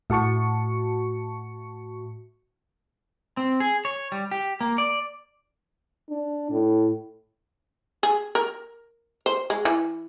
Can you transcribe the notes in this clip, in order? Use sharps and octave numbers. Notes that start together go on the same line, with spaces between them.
A2 F#4 A5 C#6 C#7
C4
G#4
C#5
G3
G4
A#3
D5
D4
A2
G#4
A#4
C5
G#3
E3